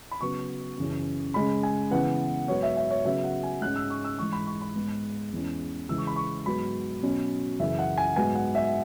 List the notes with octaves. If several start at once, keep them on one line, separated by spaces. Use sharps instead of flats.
B5
C#3 F#3 B3 C#6
F#2 C#3 E3 C#4
C#3 G#3 C#4 B5
G#5
C#3 E3 B3 F#5
G#2 F#3 B3 C#5
E5
E5
C#5
C#3 F#3 B3 E5
F#5
G#5
G#2 G#3 C#4 F#6
E6
C#6
E6
G#2 E3 G#3 C#6
B5
C#6
B5
G#2 G#3 B3
E2 E3 G#3 C#4
C#3 E3 G#3 E6
C#6
B5
C#6
G#2 F#3 B3 B5
B2 F#3 C#4
F#2 C#3 E3 E5
F#5
G#5
G#2 F#3 B3 G#5
F#5
E5